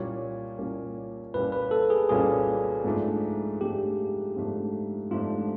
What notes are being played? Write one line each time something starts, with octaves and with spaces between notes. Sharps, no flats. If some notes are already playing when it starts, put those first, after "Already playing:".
Already playing: C2 A#2 G3 A#3 C#4 C#5
C2 A#2 G3 A#3 C#4
C2 A#2 G3 A#3 C#4 B4
B4
A4
G#4
C2 A#2 G3 A#3 C#4 G#4
G#2 F3 A3 D4
G#2 F3 A3 D4 G4
G#2 F3 A3 D4
G#2 F3 A3 D4 F4